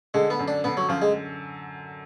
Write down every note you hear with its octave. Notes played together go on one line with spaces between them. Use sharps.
D3 G#3
B3
F#2
D4
D3 B3
F#3
F#2 F3
G#3